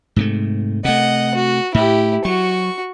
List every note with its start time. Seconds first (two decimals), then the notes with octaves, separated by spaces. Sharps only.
0.16 G#2 C3 A3
0.85 C3 A3 D#5 F#5
1.35 F#4
1.74 A2 E4 G4
2.25 F#3 F#4 C#6